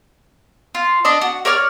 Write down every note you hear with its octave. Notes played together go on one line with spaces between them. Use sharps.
F4
D4 D5 D#5 A5
F#4
A#4 C#5 D5 F6